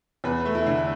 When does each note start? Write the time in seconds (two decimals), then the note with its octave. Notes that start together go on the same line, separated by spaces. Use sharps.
0.24 E2 B4
0.45 A3
0.55 E4
0.66 D3